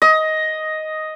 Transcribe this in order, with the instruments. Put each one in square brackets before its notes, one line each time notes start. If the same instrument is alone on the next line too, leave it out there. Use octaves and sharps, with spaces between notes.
[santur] D#5